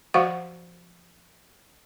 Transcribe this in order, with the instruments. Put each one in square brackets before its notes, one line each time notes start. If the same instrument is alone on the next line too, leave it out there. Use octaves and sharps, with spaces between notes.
[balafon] F3 F#4 C5 F5 F#5 C#6